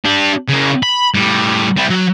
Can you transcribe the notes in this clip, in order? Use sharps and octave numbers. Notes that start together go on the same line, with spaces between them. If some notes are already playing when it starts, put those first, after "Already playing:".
D4 G4
C#3 A#3
B5
A2 G3
G3 E4
F#3